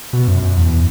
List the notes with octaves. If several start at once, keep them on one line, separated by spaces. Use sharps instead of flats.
B2
F#2
F#2
E2